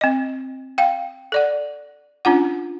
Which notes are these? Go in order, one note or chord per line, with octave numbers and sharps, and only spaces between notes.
C4 D#5
F5 G5
A4 D5 F#5
C#4 D4 F4 F#5